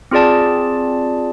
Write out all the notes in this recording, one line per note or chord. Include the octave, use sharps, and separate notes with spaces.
C4 F4 G#4 D5 A5